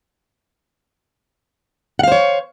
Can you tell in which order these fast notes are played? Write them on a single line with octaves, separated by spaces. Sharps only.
F#5 F5 C5 C#5